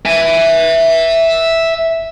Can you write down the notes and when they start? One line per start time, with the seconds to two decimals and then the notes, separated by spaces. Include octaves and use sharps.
0.06 E5 G#5